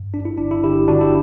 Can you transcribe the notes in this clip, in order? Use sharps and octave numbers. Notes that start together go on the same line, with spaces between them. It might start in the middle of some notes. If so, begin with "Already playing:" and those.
Already playing: G2
G1 D4
E4
G1 D4
E4
G1 E4 G4
G1 D4 F#4
E4 G4